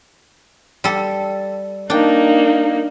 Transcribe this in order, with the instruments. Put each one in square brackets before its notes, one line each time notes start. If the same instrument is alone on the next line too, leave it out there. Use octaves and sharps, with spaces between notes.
[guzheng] G3 A4
[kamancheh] A#3 D#4 [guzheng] D4 G5